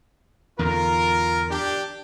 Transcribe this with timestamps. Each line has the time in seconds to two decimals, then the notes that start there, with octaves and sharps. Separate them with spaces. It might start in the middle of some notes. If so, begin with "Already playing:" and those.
0.59 E2 G#2 D3 F4 A#4
1.51 D4 G4